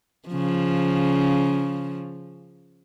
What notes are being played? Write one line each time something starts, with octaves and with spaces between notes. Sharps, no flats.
C#3 F3